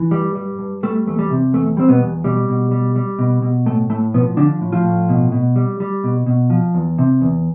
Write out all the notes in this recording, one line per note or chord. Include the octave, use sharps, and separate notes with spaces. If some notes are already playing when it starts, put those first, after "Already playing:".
Already playing: E3
G2 G3
G3
G2
G3 A3
E2 A3
G3
C3
E2 A3
G3 C4
B2 B3
E2
B2 G3
B2
G3
G3
B2
B2
A2 A3
A2 A3
B2 F3 B3
D3 F3 D4
A2
F3 F4
A2
B2
B2
G3
G3
B2
B2
F3
E2
C3
E2